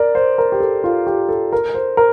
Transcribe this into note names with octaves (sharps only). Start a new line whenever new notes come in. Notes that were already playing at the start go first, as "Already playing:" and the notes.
Already playing: A#4 D5
C5
A#4
G4
A4
F4
G4
A4
A#4
C5
A#4